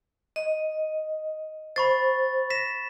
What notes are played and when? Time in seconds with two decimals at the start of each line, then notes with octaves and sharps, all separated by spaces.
0.36 D#5
1.76 C5 B5 C#6 A6
2.50 A#6 B6 E7